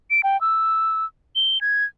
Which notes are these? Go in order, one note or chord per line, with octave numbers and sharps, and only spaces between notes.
D7
G5
E6
G7
G#6